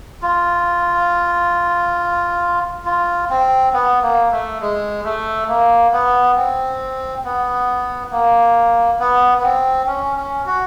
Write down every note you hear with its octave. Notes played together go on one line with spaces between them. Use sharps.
F4
F4
C4
B3
A#3
A3
G#3
A3
A#3
B3
C4
B3
A#3
B3
B3
C4
C#4
C#4
F#4